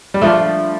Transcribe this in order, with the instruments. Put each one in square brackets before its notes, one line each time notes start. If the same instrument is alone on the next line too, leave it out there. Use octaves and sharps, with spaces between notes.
[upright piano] G3
[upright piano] F3 [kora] A3 D4 F4